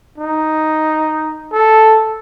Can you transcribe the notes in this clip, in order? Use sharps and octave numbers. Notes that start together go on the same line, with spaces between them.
D#4
A4